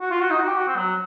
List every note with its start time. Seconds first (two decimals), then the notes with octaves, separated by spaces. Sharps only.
0.01 F#4
0.11 F4
0.21 F#4
0.30 D#4
0.39 F#4
0.48 G4
0.58 F#4
0.68 C4
0.77 F#3